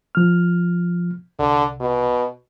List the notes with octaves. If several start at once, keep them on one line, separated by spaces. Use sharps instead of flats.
F3 F6
C2 D3
B2